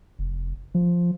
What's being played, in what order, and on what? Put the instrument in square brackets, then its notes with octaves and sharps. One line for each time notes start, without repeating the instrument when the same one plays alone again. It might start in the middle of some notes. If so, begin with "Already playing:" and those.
[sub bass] F1
F3